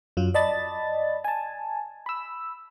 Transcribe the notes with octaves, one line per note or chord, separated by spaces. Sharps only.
F#2 F#3 F4
D5 D#5 A5 B5 A6
G#5 A5
B5 E6